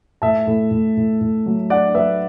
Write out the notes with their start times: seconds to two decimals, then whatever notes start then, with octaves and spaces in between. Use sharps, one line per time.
0.22 A2 E5 A5
0.47 A2
0.71 A2
0.97 A2
1.21 A2
1.46 F#3
1.70 D4 D5 F#5
1.94 F#3 B4 E5